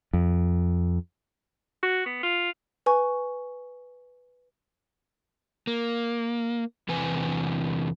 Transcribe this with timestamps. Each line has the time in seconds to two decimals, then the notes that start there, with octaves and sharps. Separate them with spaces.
0.13 F2
1.83 F#4
2.06 B3
2.23 F4
2.86 B4 G#5 C#6
5.67 A#3
6.88 E2 C3 E3 B4 G#5